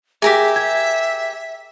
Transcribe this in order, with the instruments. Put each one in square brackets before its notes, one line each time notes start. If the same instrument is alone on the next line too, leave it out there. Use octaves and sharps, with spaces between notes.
[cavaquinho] G4 A#4 G#5 [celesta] G#4 B6 [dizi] E5
[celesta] G#6